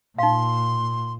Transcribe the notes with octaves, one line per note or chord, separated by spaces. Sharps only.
A#2 D#4 F5 C6